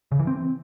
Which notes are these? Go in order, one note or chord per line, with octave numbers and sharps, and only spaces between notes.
C#3
E3
C4